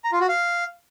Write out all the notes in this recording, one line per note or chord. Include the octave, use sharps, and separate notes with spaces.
A#5
F4
F#4
F5